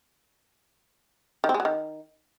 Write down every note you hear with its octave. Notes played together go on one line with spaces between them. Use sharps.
D#3
C4
G#3
F#3
D#3